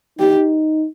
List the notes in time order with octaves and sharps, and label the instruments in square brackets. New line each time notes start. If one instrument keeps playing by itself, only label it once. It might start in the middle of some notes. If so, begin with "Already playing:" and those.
[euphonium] D#4 [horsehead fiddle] G4